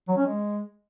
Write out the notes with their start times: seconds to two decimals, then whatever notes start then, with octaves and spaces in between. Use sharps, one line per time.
0.08 F#3
0.17 C#4
0.26 G#3